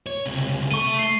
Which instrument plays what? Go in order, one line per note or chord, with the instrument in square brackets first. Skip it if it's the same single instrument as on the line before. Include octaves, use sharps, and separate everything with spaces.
[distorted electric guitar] C#5
C#2 C3
[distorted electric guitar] A3 A4 [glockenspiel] C#6 D#7
[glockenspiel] C7 G7